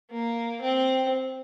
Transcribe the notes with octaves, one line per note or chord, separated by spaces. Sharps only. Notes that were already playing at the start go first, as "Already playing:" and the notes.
A#3
C4